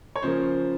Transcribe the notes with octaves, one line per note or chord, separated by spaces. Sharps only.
C#5
C#3 F3 A#3 C5